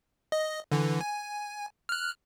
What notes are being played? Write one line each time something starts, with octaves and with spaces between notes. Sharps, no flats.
D#5
D3 E3
G#5
F6 F#6